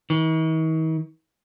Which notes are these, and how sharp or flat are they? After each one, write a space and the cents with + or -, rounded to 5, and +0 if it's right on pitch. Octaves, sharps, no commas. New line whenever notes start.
D#3 +45